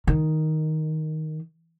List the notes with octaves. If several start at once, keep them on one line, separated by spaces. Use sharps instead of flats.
D#3